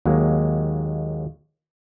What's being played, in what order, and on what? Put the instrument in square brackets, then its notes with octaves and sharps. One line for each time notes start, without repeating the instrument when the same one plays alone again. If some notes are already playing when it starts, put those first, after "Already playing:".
[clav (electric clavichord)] D#2 F#3 G#3 A#3